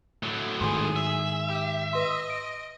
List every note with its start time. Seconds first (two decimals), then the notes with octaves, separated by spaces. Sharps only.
0.23 A2 F#3
0.61 G#2 D#3 G#4 C6
0.96 E5
1.48 G4
1.93 B4 D#5 C6
2.30 D7